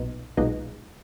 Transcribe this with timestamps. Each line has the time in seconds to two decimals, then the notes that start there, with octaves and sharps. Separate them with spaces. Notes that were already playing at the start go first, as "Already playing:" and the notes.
Already playing: B1 A#2 B3 D#4
0.37 B1 A#2 G#3 B3 D#4